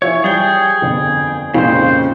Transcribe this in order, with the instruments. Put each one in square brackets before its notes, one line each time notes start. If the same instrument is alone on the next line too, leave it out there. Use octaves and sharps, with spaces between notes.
[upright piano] E3 F3 E5 [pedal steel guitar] C#5
[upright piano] G3 A6 G7 [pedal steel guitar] G#4 G5
[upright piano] G1 F2
[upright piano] G#1 F2 A#2 [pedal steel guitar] C#3 C5